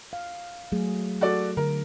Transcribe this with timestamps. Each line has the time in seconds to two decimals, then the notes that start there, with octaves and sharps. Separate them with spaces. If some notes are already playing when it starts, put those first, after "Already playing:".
0.13 F5
0.72 F#3 A3 G#4
1.21 F#4 A4 D5
1.57 D3 A#4